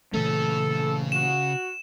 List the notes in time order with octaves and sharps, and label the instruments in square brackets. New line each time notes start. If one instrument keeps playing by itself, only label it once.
[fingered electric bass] A#2 E3 A3 [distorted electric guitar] C#3 C#4 [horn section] A4
[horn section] F#4 [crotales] E7